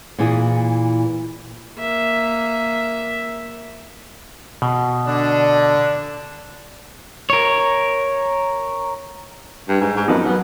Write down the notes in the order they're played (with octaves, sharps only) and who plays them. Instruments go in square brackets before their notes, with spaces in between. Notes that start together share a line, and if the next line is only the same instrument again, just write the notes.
[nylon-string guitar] A#2 E3 E4 G#4
[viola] A#3 E5
[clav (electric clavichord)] B2
[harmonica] D3 D4
[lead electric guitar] A#4 C#5
[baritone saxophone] G2
G#2
G#2
[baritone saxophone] F#2 [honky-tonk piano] F3 B3 D#4
[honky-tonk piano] F#3 [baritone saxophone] B3